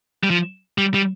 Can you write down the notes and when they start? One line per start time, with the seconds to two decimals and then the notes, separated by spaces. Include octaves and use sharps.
0.23 G3
0.30 F3
0.78 G3
0.94 G3